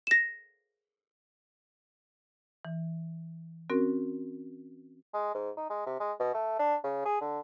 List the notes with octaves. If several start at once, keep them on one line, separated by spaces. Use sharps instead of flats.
A#6 E7
E3
C4 C#4 F#4 A#4
G#3
G#2
D#4
G#3
C3
G#3
B2
A3
D4
C#3
G#4
D3